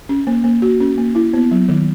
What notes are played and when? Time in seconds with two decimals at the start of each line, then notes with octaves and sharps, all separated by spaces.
0.09 C#4
0.27 A#3
0.44 A#3
0.62 F#4
0.80 C#4
0.98 A#3
1.15 E4
1.33 B3
1.51 F#3
1.68 D#3